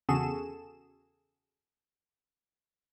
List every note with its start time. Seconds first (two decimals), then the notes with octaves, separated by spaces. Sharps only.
0.09 E2 C#3 F#4 G#4 A4 E7